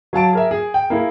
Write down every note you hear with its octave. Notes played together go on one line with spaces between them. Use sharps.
F#3 F5 A5 D7
G#4 A#4 E5
G#4
G5
A#3 E4 G#4 A#4